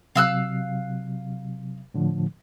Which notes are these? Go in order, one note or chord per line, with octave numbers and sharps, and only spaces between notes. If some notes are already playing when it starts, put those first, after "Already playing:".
C3 F#3 F5 E6 F#6
A2 D3 F3